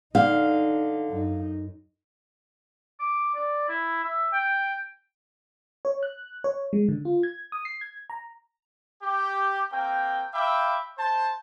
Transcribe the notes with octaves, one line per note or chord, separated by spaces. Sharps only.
D3 D#4 F5
F#2 D#4
D6
D5
E4
E5
G5
C#5
F#6
C#5
G#3
D3
F4
G#6
D#6
C7
G#6
A#5
G4
A#3 C4 G5
E5 F5 G5 B5 D6
C5 A5